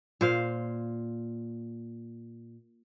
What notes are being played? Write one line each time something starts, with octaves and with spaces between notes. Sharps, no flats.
A#2 C5 F5